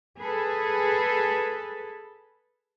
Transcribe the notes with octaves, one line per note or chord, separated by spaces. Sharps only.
G#4 A4 B4